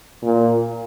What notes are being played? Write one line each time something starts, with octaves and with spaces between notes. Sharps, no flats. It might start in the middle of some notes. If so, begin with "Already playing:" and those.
A#2